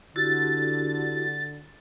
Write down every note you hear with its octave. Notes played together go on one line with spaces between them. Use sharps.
D3 E4 F#4 G4 A6